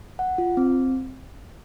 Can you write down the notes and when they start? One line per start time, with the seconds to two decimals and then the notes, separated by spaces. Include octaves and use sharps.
0.19 F#5
0.38 F4
0.57 C4